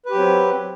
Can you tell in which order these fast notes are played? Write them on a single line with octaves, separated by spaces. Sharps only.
B4 G4 F#3 C4